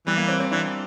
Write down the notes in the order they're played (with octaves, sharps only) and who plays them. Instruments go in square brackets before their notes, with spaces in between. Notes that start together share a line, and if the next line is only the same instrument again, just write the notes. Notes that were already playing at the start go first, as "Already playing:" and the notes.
[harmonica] E3 [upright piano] G3
[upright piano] A#3
C4
C4
[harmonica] E3 [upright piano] D4